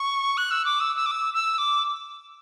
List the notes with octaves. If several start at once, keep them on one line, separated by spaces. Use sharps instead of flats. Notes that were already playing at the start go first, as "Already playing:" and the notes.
Already playing: C#6
F#6
E6
D6
E6
E6
D6
E6
E6
D6